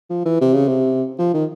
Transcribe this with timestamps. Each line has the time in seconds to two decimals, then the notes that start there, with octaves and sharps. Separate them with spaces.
0.10 F3
0.25 E3
0.41 C3
0.54 C#3
0.68 C3
1.19 F3
1.34 D#3